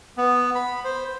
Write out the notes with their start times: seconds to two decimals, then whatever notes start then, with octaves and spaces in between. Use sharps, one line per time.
0.17 B3
0.55 B5
0.84 C5